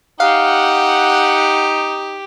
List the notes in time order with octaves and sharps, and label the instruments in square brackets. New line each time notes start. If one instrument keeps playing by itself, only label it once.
[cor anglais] D#4 [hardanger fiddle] G4 [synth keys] F5 [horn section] F#5